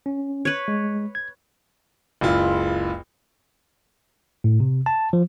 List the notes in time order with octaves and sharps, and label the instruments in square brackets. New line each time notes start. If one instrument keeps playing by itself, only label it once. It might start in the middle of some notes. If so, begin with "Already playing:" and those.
[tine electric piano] C#4
[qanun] B4 C#5
[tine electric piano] G#3
G#6
[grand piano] F#1 C#2 E4 F4
[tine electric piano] A2
C3
A5
F3